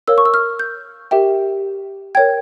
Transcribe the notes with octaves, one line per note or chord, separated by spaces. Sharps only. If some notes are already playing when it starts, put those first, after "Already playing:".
A#4 C#5 F5 E6
C#6
E6
F6
G6
G4 A#4 E5 G5
A#4 C#5 G5 G#6